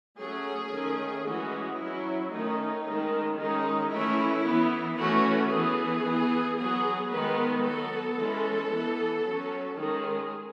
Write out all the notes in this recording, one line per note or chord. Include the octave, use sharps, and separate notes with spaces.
F#3 A3 C#4 G#4
D#3 A3 C#4
E3 G#3 C#4 F#4
F#3 C#4 E4
D#3 A3 C#4 D#4
D#3 G#3 C#4
D#3 G#3 C#4 D#4
E3 A3 C#4 E4
E3 B3
E3 A3 C#4 F#4
E3 B3 G#4
E3 B3
F#3 B3 G#4
D#3 G#3 B3 B4
F#3 B3 A4
E3 G#3 C#4
E3 B3
F#3 C#4
D#3 G#3 C#4 G#4